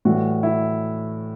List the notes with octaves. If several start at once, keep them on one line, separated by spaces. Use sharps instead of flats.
A2 E3 G3 F#4
E4